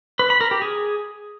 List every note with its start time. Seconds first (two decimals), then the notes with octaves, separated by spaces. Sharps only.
0.19 B4
0.30 B5
0.41 A#4
0.51 G4
0.62 G#4